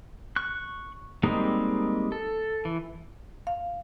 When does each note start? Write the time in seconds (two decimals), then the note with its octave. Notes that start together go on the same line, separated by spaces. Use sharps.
0.36 C#6 F#6
1.23 G3 G#3 A#3 C4 D#4
2.12 A4
2.65 E3
3.47 F5